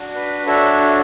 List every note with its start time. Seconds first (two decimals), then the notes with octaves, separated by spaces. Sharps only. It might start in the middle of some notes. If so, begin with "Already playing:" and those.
Already playing: D4 F#4
0.15 B4
0.46 D4 F#4 A4 C#5 E5